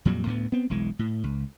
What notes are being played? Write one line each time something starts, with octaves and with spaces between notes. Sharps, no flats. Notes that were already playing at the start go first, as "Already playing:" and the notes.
F2 A#2 F#3 G3
D2 A2 A3 B3
B3 C4
E1 B1 E3 G#3
A2
C#2